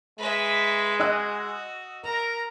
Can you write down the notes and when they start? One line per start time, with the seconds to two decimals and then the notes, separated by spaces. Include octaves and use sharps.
0.18 G#3 B4 E5
1.00 F#4 D#5 E6 F#6
2.04 A#4 A#5